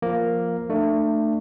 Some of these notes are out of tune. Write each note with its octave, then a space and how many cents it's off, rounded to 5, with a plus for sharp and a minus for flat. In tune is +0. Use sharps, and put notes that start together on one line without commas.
F3 +0 A#3 +0
A3 +20 D4 +35